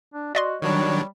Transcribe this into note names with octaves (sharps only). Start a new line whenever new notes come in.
D4
F#4 D5 D#5 C6
D#3 F#3 G3 D4 C#5